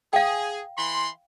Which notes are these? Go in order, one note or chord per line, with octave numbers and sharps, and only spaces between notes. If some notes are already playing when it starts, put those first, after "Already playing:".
G#4 F5 G5
E3 B5 C6